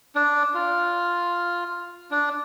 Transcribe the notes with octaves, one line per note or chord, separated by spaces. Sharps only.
D4
F4
D4